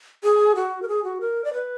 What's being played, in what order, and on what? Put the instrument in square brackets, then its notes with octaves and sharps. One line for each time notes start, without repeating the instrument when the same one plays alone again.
[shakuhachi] G#4
F#4
A#4
G#4
F#4
A#4
D5
B4